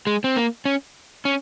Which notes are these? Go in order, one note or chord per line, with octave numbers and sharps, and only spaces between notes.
G#3
C4
A#3
C#4
C#4